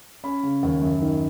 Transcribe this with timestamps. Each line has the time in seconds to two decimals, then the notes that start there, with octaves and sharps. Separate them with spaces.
0.24 C#4 B5
0.43 C#3
0.63 D#2
0.82 F#2
1.02 D#3